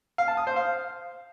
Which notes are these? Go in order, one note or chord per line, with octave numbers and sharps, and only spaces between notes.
F5
A5
D#6
C5
F5